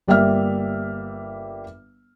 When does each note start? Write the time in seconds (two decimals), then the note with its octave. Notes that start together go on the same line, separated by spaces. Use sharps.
0.08 G1 G3 A#3 E5 F6